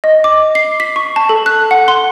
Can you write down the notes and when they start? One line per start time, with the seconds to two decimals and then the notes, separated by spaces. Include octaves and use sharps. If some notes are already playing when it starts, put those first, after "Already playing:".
0.04 D#5
0.24 D6
0.55 C7
0.80 B6
0.96 C#6
1.16 A5
1.29 A4
1.46 F#6
1.71 F#5
1.88 C6